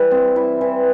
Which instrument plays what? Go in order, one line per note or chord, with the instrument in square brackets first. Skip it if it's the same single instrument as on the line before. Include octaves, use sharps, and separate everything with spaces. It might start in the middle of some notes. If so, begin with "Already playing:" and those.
Already playing: [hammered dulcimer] E3 G3 E4
C4
E4
E3